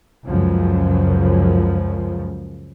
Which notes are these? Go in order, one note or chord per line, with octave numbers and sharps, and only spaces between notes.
C#2 F#2 C#3 F3